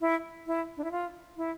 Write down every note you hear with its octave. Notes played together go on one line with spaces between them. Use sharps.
E4
E4
D4
E4
F4
E4